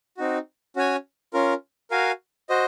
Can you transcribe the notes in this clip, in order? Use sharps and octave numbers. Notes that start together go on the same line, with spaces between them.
C4 D#4 F#4
C#4 F#4 C#5 G#5
C#4 F4 A#4
F#4 A#4 F5 G#5
F#4 C5 D#5